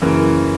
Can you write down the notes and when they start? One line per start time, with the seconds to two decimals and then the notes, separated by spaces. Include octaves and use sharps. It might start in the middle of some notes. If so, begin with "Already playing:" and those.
0.02 F#2 C#3 E3 A#3